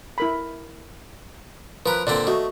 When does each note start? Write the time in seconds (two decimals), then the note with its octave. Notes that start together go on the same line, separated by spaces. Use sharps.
0.18 E4 A#4 B5
1.86 F3 A#4 B4
2.07 A#2 D3 C4 D5
2.27 A3 F#4 D#5